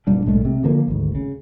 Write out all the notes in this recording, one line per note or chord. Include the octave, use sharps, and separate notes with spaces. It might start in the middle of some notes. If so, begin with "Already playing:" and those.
F#1 A#2 G3 D4
B1 A2 G#3 A3
C3
D3 F3 A#3
G#1 D2
C#3